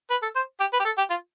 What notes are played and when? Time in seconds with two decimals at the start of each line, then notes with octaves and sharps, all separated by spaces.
0.10 B4
0.23 A4
0.36 C5
0.60 G4
0.73 B4
0.79 G4
0.85 A4
0.98 G4
1.10 F4